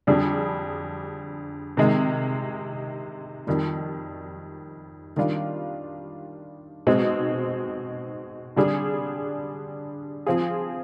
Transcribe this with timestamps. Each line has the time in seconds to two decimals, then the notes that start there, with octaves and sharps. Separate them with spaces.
0.07 F2 D3 G3 D4 G#4
1.77 C3 D#3 G#3
3.47 F2 D#3 G3
5.16 D#3 G3 D4 F4
6.87 B2 G#3 C4 D#4
8.56 D3 G3 D4 G#4
10.26 F3 C4 F4 G#4